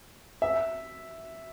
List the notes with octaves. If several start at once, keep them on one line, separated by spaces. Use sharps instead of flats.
E5